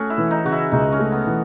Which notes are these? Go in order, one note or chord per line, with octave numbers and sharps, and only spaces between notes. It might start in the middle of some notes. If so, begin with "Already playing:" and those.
Already playing: A3 C#4 F#4 G#4
E4
E3
D#4
C#3 F#4
E4
C#2 D#4
C#4
A3
B3
E3